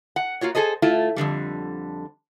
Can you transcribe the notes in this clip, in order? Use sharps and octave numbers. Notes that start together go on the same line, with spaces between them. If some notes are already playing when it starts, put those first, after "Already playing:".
F#5
A#3 F4 F#4 C#5
G#4 A4 C5 D#5
A3 E4 F4
F2 G#2 D3 G3